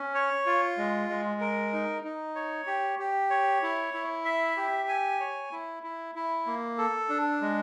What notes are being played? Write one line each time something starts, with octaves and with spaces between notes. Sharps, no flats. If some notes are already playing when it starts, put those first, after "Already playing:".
Already playing: C#4
C#5
F4
G#3
G#3
A#4
D#4
D#4
C#5
G4
G4
C#5
E4
E4
E5
G4
G#5
C#5
E4
E4
E4
A#3
A4
D4
G#3